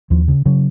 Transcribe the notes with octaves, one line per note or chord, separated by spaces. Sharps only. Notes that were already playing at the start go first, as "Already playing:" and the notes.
D#2 F3
C#3
C#3 F#3